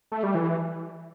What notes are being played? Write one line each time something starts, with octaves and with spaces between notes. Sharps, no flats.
A3
G3
E3